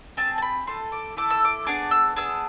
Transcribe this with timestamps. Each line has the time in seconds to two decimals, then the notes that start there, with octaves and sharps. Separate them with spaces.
0.17 C4 G#4 A5
0.38 A5
0.42 B5
0.67 A3 E4 A4 C6
0.92 D6
1.17 A3 E4 A4 D6
1.30 E6
1.44 D6
1.67 B3 D4 G#4 D6
1.91 E6
2.16 B3 D4 G#4 E6